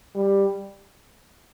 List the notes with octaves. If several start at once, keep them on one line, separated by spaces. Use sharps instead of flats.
G3